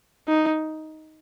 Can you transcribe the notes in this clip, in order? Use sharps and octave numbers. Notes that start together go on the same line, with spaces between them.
D#4